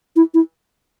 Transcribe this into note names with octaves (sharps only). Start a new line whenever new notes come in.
E4
E4